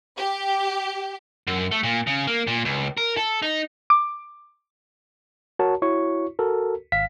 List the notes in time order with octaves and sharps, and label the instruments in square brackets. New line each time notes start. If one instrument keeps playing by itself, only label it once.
[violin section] G4
[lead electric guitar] F#2
A3
A#2
C#3
A#3
A#2
C#2
A#4
A4
D#4
[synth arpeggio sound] D6
[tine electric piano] F#4 A#4 C#5 A5
E4 F#4 C#5 C#6
F#4 A4 A#4
G#1 F5 B6